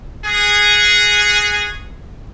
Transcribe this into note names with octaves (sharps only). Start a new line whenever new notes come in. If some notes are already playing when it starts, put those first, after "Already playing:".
F#4 G#4